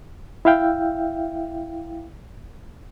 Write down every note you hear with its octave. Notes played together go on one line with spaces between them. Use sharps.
E4 E5 F5 G5